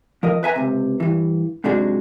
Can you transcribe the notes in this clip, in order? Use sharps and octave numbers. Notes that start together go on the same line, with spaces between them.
F3 A#4 D#5
B4 E5 G#5 A#5
C#2 C3
G2 E3
G#2 C3 F#3 G#3 D4 F#4